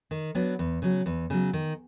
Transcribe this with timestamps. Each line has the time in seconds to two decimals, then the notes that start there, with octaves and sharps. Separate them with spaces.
0.11 D#3
0.35 F#3 B3 D4
0.59 E2
0.82 C#3 F#3
1.06 E2
1.30 C#3 F#3
1.53 D#3